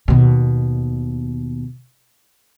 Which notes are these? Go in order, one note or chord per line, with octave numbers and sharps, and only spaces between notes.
D#2 B2